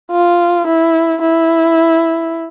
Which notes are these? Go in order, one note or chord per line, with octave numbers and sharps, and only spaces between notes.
F4
E4
E4